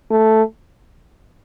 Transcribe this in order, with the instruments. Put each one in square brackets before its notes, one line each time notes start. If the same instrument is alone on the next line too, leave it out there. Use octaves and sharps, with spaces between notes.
[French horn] A3